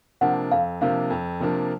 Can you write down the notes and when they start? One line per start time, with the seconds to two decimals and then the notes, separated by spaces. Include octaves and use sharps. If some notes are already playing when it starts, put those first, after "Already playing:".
0.21 C3 F3 A#3 D4 F#5
0.52 F2 F5
0.81 C3 F3 A#3 D4 F5
1.10 F2
1.40 C3 F3 A#3 D4